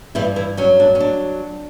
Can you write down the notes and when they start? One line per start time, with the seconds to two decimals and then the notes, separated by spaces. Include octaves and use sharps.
0.15 G2 E3 E4
0.36 E3 E4
0.57 F#3 C#4
0.80 D4
0.95 C#4
1.00 D4